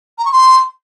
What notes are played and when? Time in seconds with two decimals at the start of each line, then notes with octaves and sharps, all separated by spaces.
0.18 A#5
0.25 C#6
0.32 C6